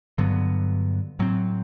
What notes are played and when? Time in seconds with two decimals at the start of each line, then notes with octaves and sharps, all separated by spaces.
0.18 G2 D3 F#3 B3
1.19 A2 F#3 C4